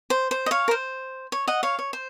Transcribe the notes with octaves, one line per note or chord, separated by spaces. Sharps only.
C5
C5
D#5
C#5 F5
A#4
C5
C#5
D#5 F#5
C#5 F5
C#5
C5